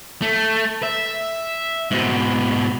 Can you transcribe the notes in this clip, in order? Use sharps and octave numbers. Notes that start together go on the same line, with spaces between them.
A3
E5
G#2 B2